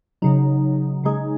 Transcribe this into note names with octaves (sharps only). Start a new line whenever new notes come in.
C#3 F#3 D#4
C#3 G#3 D#4 G#4